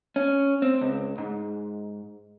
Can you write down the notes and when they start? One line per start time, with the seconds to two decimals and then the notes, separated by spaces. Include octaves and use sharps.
0.16 C#4
0.62 C4
0.81 C#2
1.18 G#2